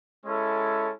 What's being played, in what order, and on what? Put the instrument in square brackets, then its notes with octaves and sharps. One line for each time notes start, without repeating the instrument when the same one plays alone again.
[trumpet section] G#3 C#4 E4 A4